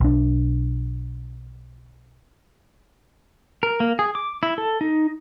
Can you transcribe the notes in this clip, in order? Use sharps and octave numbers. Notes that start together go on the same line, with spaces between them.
B1 D4
A#4
A#3
G#4
D6
E4
A4
D#4